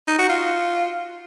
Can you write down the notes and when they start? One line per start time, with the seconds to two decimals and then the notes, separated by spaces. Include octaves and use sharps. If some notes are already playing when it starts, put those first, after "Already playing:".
0.08 D#4
0.18 F#4
0.29 F4